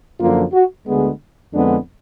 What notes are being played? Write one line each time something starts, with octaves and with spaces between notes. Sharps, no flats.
F#2 D3 F3 A#3 F4
F#4
D2 D3 G#3 B3 G#4
F2 D3 G#3 B3 D4